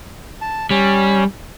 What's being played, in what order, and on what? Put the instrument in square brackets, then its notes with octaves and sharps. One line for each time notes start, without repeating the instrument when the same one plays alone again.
[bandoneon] A5
[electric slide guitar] G3 [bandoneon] C#4 C#5